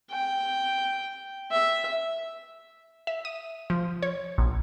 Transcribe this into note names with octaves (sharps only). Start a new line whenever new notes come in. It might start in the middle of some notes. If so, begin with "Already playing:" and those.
G5
E5
E5
D#6
F3
C#5
A#1